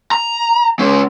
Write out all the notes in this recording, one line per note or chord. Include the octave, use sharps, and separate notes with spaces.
A#5
G#3 C#4